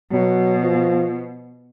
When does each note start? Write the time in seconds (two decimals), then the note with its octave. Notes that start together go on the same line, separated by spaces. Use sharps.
0.12 B2 F#3
0.62 F3